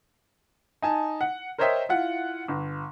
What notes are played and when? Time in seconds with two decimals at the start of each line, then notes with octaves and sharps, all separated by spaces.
0.82 D#4 G#5 A5
1.21 F#5
1.58 A#4 C5 C#5 D#5 E5 G5
1.89 E4 F4 F#5
2.48 G1